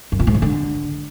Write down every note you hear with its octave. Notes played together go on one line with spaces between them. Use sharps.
F#2
A#2
G#2
D#3
D3